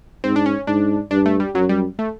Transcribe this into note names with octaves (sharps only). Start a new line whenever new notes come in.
G#2 C4
D4
C#4
G#2 D4
G2 D4
A3
G3
F#2 F#3
G3
A3